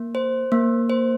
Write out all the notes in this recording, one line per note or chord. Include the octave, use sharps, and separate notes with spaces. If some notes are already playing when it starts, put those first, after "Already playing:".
Already playing: A#3
C5
A#3
C5